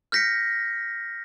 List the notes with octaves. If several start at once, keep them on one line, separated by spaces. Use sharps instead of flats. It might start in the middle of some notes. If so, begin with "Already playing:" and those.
F6 G6 A#6 B6 C#7